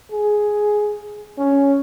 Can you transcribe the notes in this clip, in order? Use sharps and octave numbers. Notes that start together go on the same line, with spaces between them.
G#4
C#4